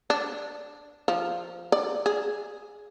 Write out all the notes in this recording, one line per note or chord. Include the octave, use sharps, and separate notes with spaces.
D4
F3
D5
G#4